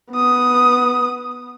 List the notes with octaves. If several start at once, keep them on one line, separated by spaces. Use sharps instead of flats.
B3 D#6